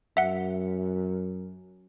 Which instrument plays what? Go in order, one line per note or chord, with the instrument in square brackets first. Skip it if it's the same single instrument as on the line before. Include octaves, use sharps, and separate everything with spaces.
[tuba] F#2 [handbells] E5 F#5